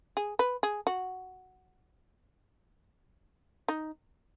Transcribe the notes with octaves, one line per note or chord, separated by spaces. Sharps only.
G#4
B4
G#4
F#4
D#4